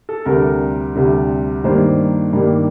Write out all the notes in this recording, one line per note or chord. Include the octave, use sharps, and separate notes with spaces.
A4
D2 C3 G3 A#4
D2 C3 G3
G2 D#3 G3 A#3 C5
G2 D#3 G3 A#3